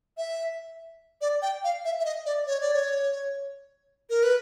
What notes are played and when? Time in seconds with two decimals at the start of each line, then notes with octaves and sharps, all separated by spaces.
0.18 E5
1.21 D5
1.42 G5
1.64 F5
1.85 E5
2.00 E5
2.05 D#5
2.26 D5
2.47 C#5
2.61 D5
2.74 C#5
4.10 A#4
4.23 B4